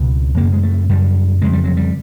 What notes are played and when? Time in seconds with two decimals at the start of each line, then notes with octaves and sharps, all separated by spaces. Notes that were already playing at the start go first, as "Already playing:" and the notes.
Already playing: C#2 B2 B3
0.37 F#2 C#3 A#3
0.53 G#3
0.63 A3
0.89 F#2 C#3 G3
1.42 F2 C#3 G#3
1.53 G3
1.64 F#3
1.77 G3